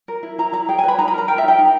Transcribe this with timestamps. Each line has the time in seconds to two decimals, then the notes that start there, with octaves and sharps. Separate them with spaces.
0.08 A#4
0.23 E4
0.38 E4 A#5
0.53 E4 A#5
0.68 G#4 G5
0.79 G#5
0.83 B4
0.88 B5
0.98 D#4 A#5
1.08 B5
1.14 A#4 A#5
1.28 A#4 G5
1.38 E5
1.43 D#4 G5
1.58 D#4